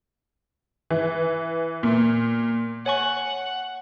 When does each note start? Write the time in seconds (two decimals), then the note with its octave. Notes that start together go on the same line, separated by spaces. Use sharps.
0.90 E3
1.83 A#2
2.86 C#5 F#5 G#5 C#6